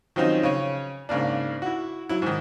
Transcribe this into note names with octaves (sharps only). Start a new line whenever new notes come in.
D#3 F3 F#3 C4 C#4 D#4
C#3 C#4
G#2 C#3 A#3 D4
E4 F#4
F#3 E4
G#2 D#3